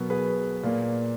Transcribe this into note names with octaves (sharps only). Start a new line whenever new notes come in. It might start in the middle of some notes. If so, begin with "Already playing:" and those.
Already playing: B2 F#3 B3 A#4
G#4 B4
A#2 A#3